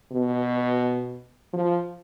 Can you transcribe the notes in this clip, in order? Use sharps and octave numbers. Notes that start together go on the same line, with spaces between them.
B2
F3